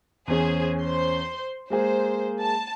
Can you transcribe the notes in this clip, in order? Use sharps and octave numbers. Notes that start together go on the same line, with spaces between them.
E2 C#4 G#4 C5
C5 C6
G#3 A#3 G#4 C5
A5